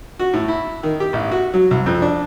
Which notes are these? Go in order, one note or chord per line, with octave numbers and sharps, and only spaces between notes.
F#4
A2
E4
D#3
G4
A1
F#4
F#3
C2
F2
D4